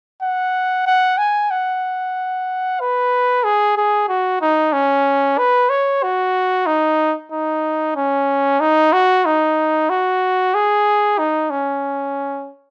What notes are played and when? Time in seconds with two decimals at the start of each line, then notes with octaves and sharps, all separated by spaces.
0.22 F#5
0.86 F#5
1.18 G#5
1.51 F#5
2.80 B4
3.44 G#4
3.77 G#4
4.09 F#4
4.41 D#4
4.73 C#4
5.38 B4
5.70 C#5
6.03 F#4
6.66 D#4
7.32 D#4
7.96 C#4
8.60 D#4
8.93 F#4
9.26 D#4
9.90 F#4
10.55 G#4
11.18 D#4
11.50 C#4